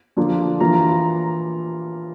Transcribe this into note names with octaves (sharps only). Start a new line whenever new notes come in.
D3 F3 A#3 D4 F4
E3 A#3 F4 A#5
A#5
A#5